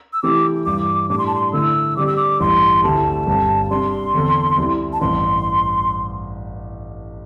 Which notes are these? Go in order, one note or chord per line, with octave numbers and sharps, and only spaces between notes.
E6
C3 E3 A3 E4 G4 D6
G2 E3 G3 D6
A2 G3 D4 D6
C6
A5
C6
D3 A3 E4 E6
D3 G3 C4 G4 D5 D6
E6
D6
A1 G2 E3 G3 C6
D2 C3 A3 E4 G4 A5
G1 G2 G3 C4
C3 G3 D4 C6
E2 D3 C4 A4
C2 C3 G3 C4 E4
A5
A1 G2 E3 C4 C6